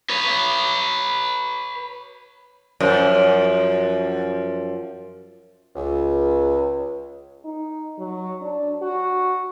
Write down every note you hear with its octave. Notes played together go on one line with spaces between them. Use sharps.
B4 C#5
F#2 F3
C#2
D#4
F#3
D4
F#4